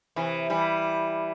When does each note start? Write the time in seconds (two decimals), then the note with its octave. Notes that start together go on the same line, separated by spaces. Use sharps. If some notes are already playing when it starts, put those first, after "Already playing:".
0.16 C3 E3
0.50 E3 G3